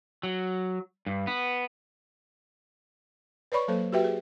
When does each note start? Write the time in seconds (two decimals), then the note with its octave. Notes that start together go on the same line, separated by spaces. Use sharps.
0.23 F#3
1.06 G2
1.27 B3
3.52 B4 C#5 D5 B5 C#6
3.68 F#3 A#3 A4 C5
3.92 F#4 G4 B4 E5 G5
4.04 G#4